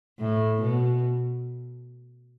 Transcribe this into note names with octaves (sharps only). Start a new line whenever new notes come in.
A2
B2